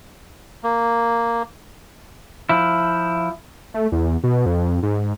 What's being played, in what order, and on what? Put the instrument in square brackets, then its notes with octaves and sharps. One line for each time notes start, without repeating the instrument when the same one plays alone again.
[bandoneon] A#3
[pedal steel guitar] F3 E4
[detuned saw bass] A3
E2
B2
F2
G#2